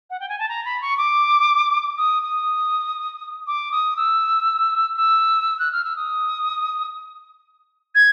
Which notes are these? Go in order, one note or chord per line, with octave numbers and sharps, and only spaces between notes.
F#5
G5
G#5
A5
A#5
B5
C#6
D6
D#6
D#6
D6
D#6
E6
E6
F#6
F6
E6
D#6
G#6